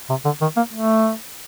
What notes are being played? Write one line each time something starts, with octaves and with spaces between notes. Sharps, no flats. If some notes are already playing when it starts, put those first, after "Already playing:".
C3
D3
D#3
A#3
A3